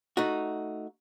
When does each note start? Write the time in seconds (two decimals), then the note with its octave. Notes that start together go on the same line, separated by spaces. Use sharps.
0.17 A3 D#4 F#4